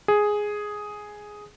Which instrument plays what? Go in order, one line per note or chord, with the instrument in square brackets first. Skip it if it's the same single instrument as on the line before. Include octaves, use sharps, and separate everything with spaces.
[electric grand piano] G#4